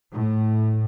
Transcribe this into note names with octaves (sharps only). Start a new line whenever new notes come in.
A2